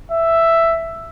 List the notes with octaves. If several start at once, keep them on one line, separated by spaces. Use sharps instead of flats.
E5